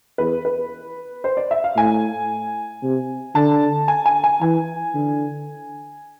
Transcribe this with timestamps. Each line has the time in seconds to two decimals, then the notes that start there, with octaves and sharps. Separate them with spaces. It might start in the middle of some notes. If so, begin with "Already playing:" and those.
0.18 E2 B4
0.45 B4
1.24 C5
1.37 D5
1.51 E5
1.64 F5
1.77 A2 G#5
2.83 C3
3.35 D3 A5
3.88 G#5
4.06 G#5
4.24 G#5
4.41 E3 G#5
4.94 D3